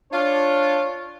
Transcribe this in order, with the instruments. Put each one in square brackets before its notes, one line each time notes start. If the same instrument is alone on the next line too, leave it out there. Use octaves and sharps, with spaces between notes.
[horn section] D4 F4 C#5